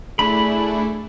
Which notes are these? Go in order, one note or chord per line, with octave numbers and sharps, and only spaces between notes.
A3 D4 E4 G#4 B5